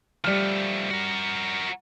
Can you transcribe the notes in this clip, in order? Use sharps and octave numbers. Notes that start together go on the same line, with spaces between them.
F3 G3 A3 F6
F#4 A#4